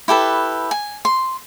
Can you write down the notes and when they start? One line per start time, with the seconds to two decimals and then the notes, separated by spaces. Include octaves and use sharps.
0.08 E4 G4 A4 B4
0.71 G#5
1.05 C6